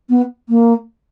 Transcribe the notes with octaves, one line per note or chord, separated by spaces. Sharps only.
B3
A#3